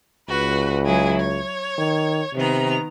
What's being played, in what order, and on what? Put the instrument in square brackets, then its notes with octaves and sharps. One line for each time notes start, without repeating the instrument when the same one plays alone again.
[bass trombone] C#2 [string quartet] F#4 B4
[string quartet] F#3 E4 G#4
C#5
[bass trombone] D#3
[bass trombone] C3 [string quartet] D#3 B3 A#5